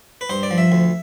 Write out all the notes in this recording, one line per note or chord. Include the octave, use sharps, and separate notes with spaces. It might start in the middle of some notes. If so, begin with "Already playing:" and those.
B4
G2 C5
D5
F3
E5
D2